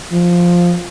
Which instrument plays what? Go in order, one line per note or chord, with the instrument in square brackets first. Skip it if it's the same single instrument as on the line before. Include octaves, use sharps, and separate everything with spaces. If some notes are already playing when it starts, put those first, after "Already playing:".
[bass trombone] F3